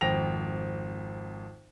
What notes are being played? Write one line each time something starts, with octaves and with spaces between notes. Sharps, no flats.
G#1 F2 G5 A#6 F7